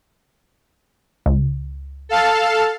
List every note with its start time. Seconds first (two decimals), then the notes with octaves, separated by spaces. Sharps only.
1.26 C#2
2.09 A4 F5 A5